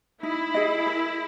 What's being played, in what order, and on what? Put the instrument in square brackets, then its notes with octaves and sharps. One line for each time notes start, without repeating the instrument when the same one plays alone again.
[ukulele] D#4 [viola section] E4
[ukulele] G#4 D#5
A#4